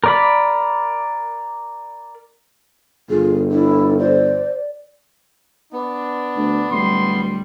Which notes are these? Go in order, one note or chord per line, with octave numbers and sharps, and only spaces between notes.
A#4 D5 B5
G1 F4 G#4
D4 E4
C5 D5
B3 D4
D2
D1 G3 C6